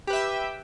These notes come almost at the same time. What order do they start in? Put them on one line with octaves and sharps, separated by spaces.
G4 B4 E5 G5